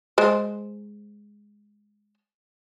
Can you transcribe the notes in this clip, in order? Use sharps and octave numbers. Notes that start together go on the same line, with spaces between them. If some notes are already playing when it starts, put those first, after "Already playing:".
G#3 C5